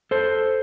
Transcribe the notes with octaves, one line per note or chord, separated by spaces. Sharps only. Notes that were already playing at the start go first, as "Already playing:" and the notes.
A4 C5